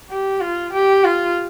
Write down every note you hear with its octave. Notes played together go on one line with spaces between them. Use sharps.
G4
F4
G4
F4